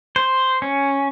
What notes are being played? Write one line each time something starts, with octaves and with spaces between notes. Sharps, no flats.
C5
C#4